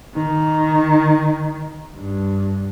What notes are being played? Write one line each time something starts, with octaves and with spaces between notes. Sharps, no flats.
D#3
G2